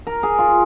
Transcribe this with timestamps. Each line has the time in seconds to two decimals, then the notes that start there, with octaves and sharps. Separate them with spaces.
0.07 A#4
0.23 G#4
0.39 F4